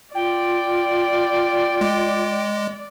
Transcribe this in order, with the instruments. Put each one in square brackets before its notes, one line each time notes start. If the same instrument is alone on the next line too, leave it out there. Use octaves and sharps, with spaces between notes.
[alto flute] F4 [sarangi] D5 [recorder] G5
[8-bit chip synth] G#3